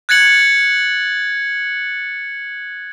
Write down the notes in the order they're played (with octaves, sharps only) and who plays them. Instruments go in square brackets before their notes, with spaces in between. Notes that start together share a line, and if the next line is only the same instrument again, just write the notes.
[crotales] F#6 G#6 A6 C#7 F#7